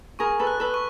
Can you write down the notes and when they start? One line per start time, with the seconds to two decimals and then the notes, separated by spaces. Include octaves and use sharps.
0.19 G#4 A#4 C#6
0.39 A4 B4
0.47 F#6
0.60 A4 B4
0.74 C#6